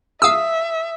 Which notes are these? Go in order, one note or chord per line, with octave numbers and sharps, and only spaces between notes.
E5 F5 D#6 E6